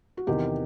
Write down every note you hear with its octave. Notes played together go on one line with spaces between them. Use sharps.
F#4
E2 C3 D#3 G4